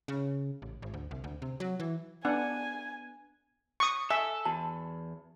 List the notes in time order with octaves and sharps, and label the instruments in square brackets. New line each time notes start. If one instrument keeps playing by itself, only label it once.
[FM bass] C#3
A1
G#1
D2
C2
D2
C3
F#3
E3
[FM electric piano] B3 [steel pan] D4 F#5 [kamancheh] G#5
[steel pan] C#6 D#6
[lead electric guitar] A4 [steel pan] E5 [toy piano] G#5
[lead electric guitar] E2 [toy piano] F#4 A5